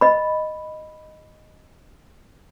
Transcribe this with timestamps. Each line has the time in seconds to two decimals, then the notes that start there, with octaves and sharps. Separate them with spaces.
0.01 D#5 B5